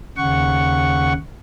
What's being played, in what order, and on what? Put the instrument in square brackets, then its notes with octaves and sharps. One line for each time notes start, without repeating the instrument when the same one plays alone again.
[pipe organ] D#2 C#3 F#5 C#6